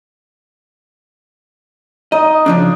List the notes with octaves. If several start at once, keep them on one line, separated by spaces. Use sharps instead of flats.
D#4 D#5
C#3 F3 D4